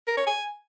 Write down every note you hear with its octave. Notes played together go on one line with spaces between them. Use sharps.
A#4
C#5
G#5